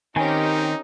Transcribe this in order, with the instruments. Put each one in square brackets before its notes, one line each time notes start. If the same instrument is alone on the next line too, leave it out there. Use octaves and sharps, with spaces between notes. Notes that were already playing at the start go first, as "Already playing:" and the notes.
[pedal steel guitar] D#3 C4 [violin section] C#4 G4 A#4 [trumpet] D#4 [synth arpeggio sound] G#5